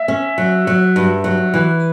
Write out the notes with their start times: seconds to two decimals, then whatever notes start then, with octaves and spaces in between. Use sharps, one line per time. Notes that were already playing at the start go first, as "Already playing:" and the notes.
Already playing: E5
0.08 C#4
0.38 F#3
0.67 F#3
0.96 G2
1.24 F#3
1.54 E3